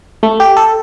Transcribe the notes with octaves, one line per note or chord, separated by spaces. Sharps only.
A3
G4
A4